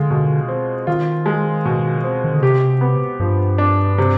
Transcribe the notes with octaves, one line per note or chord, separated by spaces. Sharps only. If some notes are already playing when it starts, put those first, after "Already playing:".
Already playing: D3 G#3 F4
B2
C4
D#3 F4
G#3
B2
C4
D#3
D3
C3 G4
B3
G2 F3
D4
C3